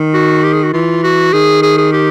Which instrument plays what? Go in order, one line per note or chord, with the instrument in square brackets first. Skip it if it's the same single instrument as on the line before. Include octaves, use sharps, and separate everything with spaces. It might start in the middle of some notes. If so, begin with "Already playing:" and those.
Already playing: [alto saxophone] D#3
[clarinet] F#4
G4
G#4
F#4
[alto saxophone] E3 [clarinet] F4
[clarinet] F#4
[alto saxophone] D#3 [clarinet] G#4
[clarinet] G#4
G#4
G4